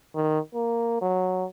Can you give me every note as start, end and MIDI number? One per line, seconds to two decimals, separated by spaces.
0.15 0.39 51
0.55 0.98 58
1.02 1.45 54